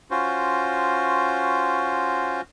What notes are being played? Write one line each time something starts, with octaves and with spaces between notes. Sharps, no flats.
C#4 F4 F#4 C5